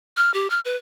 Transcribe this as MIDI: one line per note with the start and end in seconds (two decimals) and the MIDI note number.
0.17 0.33 89
0.34 0.50 67
0.50 0.60 89
0.65 0.76 71